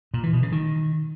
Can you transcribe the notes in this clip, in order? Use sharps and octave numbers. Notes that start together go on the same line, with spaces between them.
A#2
E3
B2
C#3
D#3